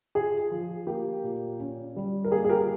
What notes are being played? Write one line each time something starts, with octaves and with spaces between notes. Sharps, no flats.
F4 G#4
F3
A#3 G4
A#2
C#4
G3
A#4
A#3 G#4
G#4
G4 A#4